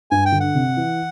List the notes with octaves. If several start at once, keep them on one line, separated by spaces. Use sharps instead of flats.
G2 G#5
G5
D3
F#5
C3
E3